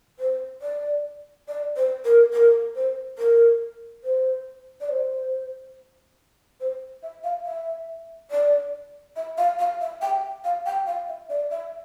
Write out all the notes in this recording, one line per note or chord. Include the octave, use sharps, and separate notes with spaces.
C5
D5
D5
C5
A#4
A#4
C5
A#4
C5
D5
C5
C5
E5
F5
E5
D5
E5
F5
F5
E5
G5
F5
G5
F5
E5
D5
E5